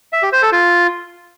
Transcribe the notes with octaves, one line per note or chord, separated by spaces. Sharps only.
E5
G4
C5
A4
F4